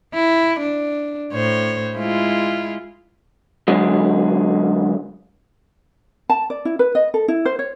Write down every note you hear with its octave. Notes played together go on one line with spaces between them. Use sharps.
E4
D4
A2 C5 C#5
G#3 E4 F4
F#2 D3 F#3 G#3
A5
D5
E4
B4
D#5
A4
E4
C5
C#5